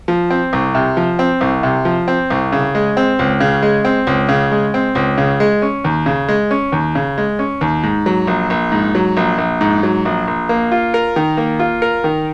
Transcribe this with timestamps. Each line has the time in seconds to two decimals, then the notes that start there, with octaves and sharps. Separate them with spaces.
0.08 F3
0.30 C4
0.53 C2
0.75 C3
0.97 F3
1.19 C4
1.41 C2
1.63 C3
1.85 F3
2.08 C4
2.30 C2
2.52 C#3
2.75 G#3
2.97 C4
3.19 C#2
3.40 C#3
3.62 G#3
3.85 C4
4.07 C#2
4.29 C#3
4.52 G#3
4.74 C4
4.95 C#2
5.18 C#3
5.40 G#3
5.62 C#4
5.84 D#2
6.06 C#3
6.28 G#3
6.51 C#4
6.72 D#2
6.95 C#3
7.18 G#3
7.39 C#4
7.61 D#2
7.83 G#2
8.06 F#3
8.27 A#1
8.50 A#1
8.72 G#2
8.95 F#3
9.17 A#1
9.38 A#1
9.61 G#2
9.83 F#3
10.05 A#1
10.27 A#1
10.49 A#3
10.72 F4
10.94 A#4
11.16 D#3
11.37 A#3
11.59 F4
11.82 A#4
12.04 D#3